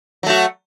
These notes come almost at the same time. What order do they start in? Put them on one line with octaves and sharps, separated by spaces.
F#3 A3 F#4